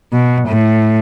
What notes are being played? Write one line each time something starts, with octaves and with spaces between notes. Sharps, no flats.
B2
A2